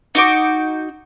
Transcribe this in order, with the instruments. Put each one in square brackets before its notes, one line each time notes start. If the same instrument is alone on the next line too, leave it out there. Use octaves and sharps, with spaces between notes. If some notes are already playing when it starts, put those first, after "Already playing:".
[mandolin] D#4 F#4 D6